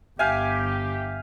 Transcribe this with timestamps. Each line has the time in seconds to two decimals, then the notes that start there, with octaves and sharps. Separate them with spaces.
0.19 G1 G4 E5 F5 G#5 G6 B6